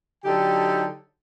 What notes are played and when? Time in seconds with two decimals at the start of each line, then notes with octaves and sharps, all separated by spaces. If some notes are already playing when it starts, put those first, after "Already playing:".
0.25 D3 F#3 D#4 G4 A4 G5